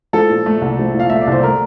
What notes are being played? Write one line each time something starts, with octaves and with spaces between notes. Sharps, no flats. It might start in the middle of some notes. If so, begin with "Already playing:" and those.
F3 A4
A#2
A3
C2
F3
A#2
F5
A3 E5
D5
C2 C5
A3 A#4